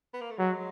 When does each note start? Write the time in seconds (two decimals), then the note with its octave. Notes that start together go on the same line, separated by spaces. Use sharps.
0.14 B3
0.21 A#3
0.31 A3
0.38 F#3 G#3